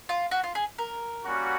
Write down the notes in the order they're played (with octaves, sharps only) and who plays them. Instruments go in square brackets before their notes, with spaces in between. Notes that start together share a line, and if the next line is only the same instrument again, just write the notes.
[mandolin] F4
F#4
F4
G#4
A#4
[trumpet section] G3 A#3 C#4 F#4